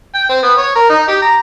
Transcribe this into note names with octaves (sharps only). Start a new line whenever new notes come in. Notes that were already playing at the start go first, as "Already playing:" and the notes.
G5
C4
B3
C#5
A#4
D#4
G4
A#5